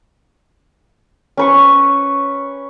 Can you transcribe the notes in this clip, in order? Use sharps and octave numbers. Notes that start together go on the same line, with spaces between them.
C#4 B4 C#6